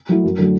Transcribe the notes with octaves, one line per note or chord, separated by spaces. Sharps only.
F#3 A3 E4
F#2
D3 F#3 A3